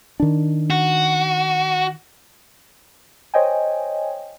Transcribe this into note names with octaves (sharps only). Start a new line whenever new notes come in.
D#3 D4
F#4
C5 C#5 D#5 G5 G#5